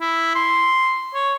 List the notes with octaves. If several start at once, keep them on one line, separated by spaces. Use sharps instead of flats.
E4
C6
C#5